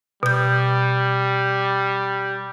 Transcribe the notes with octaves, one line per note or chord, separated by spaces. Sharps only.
B2 G3 G6